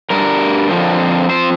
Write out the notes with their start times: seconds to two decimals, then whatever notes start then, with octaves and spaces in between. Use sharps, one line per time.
0.10 G2 G3 D4 A#4
0.69 F2 D3 F3 C4
1.29 F3 C4 C5